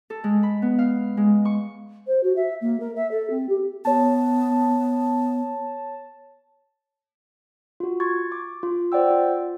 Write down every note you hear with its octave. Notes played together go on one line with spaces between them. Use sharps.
A4
G#3
B5
B3
F5
G#3
C#6
C5
F#4
E5
A#3
A#4
E5
A4
C4
G4
B3 C#5 A5
F4 F#4
C6 C#6 G#6 A6
D6
F4
C5 D5 F#5 G5 E6
F4